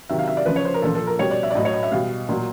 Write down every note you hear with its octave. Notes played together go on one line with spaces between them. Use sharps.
C3 D#3 F#3 E5
F5
E5
D5
C#3 F3 B4
C#5
C5
A#4
A#2 F3 A4
A4
A#4
B2 G3 C#5
D5
E5
D5
A2 F#3 D#5
C#5
D#5
E5
B2 G3 F5
A#2 F#3